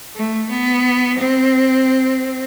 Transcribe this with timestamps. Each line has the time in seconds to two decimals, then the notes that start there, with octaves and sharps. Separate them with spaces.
0.16 A3
0.50 B3
1.18 C4